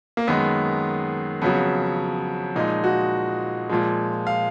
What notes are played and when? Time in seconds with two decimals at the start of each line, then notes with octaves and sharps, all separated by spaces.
0.17 A#3
0.27 F#2 D#3 G#3 B3
1.42 F2 C#3 F#3 B3
2.56 A#2 F3 G#3 D#4
2.84 F#4
3.69 A#2 F3 G#3
4.27 F5